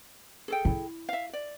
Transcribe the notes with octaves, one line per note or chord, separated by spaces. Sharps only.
G#4 A4 G5
E4
E5 F5
D5